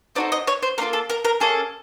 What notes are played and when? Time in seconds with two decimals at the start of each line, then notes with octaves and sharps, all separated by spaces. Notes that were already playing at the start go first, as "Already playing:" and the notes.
0.15 C4 D#4 F#4 A4 D5
0.32 D#5
0.47 C#5
0.63 C5
0.78 A#3 D4 F4 A4 A#4
0.93 A4
1.10 A#4
1.25 A#4
1.40 A#3 C#4 G#4 A4